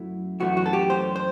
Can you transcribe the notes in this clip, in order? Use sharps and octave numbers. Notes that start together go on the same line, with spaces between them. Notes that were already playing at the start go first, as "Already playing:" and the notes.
Already playing: F#2 F#3 A3 E4
F#2 E3 A3 F#4
F#4
A4
G4
C5
C5